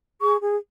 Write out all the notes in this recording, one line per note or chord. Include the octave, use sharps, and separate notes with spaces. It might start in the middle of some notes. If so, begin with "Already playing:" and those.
G#4 C#6
G#4